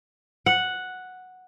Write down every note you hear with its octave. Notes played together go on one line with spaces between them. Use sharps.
F#5